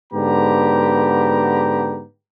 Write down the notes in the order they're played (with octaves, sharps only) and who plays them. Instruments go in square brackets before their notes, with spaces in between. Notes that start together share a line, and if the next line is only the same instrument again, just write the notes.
[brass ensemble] G#2 D3 B3 G4 A#5